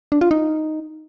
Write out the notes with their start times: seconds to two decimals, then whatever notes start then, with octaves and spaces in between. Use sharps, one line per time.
0.12 D4
0.21 F4
0.31 D#4